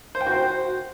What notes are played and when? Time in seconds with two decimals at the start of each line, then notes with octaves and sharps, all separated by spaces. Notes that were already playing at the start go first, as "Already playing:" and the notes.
0.15 C5
0.21 G5
0.27 F#4
0.32 C5